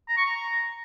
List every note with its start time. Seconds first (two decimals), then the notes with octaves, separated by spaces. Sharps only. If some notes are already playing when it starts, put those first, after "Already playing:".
0.09 A#5
0.17 C#6
0.25 A#5